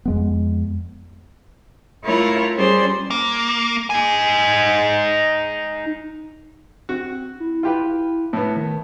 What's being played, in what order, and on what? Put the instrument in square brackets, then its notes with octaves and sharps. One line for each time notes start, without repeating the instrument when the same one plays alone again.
[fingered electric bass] F2 G#3 B3
[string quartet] A3 E4 F4 A#4 C#5 F5
G3 C#4 G#4 C5 D5
[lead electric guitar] A#3
D#4 G#5
[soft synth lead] C4 [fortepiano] F#4
[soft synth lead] E4
[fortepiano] F4 G4 B4
[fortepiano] A2 B3 [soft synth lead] A5
[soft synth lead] D#3